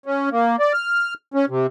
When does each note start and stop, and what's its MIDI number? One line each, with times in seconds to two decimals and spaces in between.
0.06 0.29 61
0.32 0.56 58
0.60 0.73 74
0.73 1.14 89
1.34 1.45 61
1.49 1.67 48